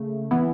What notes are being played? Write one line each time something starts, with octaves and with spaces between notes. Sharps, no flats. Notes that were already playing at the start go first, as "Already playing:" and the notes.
Already playing: C#3 A3
E3 B3 E4